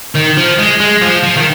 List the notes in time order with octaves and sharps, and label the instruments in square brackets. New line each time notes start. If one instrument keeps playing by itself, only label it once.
[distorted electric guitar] D#3
F3
G#3
G#3
F3
F3
D#3